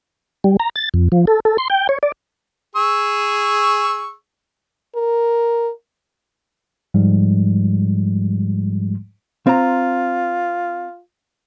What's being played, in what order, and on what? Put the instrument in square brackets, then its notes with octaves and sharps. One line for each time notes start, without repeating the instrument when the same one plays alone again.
[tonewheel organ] G3
A#5
A6
F2
F3
A4
A4
C6
G5
C#5
D5
[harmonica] G#4 C#6 E6
[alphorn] A#4
[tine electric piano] G#2 F3 G3 G#3
[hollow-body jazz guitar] C4 A#5 [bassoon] F4